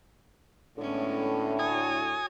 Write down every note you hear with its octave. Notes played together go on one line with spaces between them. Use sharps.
A2 D3 G#3 B3 C#4
F#4 C#5 G#5 D#6